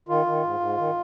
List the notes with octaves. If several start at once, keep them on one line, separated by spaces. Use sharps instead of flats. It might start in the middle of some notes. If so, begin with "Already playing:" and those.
D#3 F4
D#3
G#2
G#2
D#3